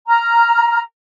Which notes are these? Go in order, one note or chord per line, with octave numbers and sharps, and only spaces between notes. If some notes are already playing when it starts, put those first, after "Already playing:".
A#5 F6